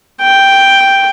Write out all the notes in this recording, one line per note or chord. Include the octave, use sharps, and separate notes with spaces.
G5